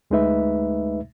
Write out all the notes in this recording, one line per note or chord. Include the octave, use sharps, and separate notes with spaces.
D2 G#3 A3 D#4 B4 E5